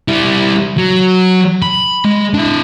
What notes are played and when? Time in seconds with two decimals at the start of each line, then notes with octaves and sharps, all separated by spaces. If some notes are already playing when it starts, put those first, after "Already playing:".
0.08 G3 E4
0.77 F#3
1.62 B5
2.05 G#3
2.34 D4 E4